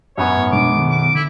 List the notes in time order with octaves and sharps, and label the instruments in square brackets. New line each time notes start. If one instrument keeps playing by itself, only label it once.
[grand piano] F#2 B3 [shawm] C#5
[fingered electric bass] G#2
[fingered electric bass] B2 G#3 D4 [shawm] D6
[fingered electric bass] B2 D#3
[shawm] D6
[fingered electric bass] D3 [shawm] E4